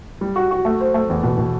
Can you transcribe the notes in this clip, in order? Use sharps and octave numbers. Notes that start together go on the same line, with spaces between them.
G3
F#4
F#4
A3
C5
A3
E2
B2
B2